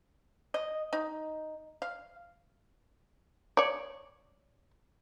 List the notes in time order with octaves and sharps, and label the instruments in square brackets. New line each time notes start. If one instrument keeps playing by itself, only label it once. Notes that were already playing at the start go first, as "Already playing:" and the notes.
[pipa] D#5
D#4
F5
[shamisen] C#5 D5